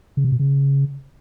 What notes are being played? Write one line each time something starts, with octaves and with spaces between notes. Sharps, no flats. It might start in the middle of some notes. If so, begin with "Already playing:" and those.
C#3
C3
B2
C#3